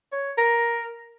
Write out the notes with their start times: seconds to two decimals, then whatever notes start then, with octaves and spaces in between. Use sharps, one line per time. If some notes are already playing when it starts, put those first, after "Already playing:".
0.12 C#5
0.38 A#4